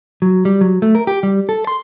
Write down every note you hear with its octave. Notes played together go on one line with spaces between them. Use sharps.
F#3
G3
F#3
A3
A#4
G4
G3
A4
C6